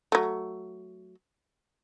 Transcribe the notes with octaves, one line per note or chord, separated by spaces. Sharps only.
F#3 A3